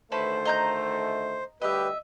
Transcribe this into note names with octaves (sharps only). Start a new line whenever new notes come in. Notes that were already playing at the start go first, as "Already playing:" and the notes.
D2 D#3 A3 C#4 B4 C5 A5
D#5 A#5 G6
D2 G3 G4 B4 D#5 E5